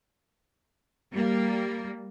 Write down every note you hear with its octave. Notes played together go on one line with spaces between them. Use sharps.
G3 A#3